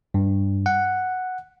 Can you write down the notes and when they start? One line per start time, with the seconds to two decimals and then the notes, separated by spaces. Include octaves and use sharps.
0.14 G2
0.66 F#5